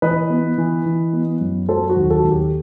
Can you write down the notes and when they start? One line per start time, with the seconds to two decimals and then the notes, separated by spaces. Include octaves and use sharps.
0.02 E3 B4 D#5
0.30 B3
0.58 E3
0.86 E3
1.13 B3
1.41 F#2
1.69 F#3 A4 C5
1.90 F#4
1.97 D#2
2.10 F#4 A4
2.24 D#2
2.31 G4